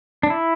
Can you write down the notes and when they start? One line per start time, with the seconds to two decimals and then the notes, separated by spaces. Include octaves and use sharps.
0.23 D4
0.30 E4